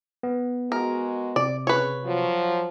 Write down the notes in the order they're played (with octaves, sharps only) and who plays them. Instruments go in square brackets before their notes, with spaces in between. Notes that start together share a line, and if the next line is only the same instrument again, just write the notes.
[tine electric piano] B3
[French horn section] G#3 F#4 [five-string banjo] A#4
[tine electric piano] C3 [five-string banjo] D5
[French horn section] C#3 [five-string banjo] B4 C#5
[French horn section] F3 F#3